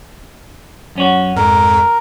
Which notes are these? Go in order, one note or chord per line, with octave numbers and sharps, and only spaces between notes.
F#2 C#4 F#4
F2 G#2 A#4